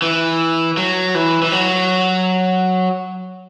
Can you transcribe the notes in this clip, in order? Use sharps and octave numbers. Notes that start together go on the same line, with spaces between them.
E3
F#3
E3
E3
F#3